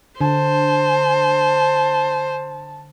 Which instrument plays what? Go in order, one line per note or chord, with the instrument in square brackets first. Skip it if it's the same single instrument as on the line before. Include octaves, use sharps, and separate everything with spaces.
[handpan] D3 [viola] C5 [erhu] A5